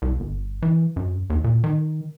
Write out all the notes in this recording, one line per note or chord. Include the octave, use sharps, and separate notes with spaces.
C2
G1
E3
F#2
D#2
A#2
D#3